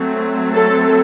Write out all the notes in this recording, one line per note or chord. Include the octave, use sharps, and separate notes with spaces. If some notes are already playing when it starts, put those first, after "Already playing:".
Already playing: F#3 A3 C4
A4